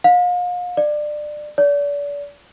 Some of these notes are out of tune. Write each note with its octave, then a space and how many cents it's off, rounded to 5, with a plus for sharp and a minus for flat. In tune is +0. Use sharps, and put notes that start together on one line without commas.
F5 +40
D5 +25
D5 -35